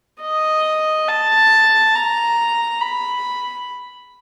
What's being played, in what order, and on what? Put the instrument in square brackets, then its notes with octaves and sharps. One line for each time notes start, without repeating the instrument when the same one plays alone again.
[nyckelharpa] D#5
A5
A#5
B5